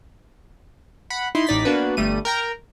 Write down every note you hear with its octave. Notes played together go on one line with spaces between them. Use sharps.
F#5 B5
D#4 E4 C6
A1 D#4 D5 A6 B6
A#3 B3 D4 F#4 B4
G1 G3 A3 D#7
A#4 G5 A#5